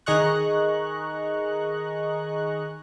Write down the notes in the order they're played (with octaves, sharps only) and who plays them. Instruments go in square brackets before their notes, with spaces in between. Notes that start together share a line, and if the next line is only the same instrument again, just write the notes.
[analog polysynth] D#3 G#4 D#5 A#5 C#6 F#6